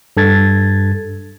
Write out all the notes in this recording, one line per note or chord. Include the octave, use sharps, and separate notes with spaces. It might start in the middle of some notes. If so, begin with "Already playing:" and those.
G2 A4 G#6 A6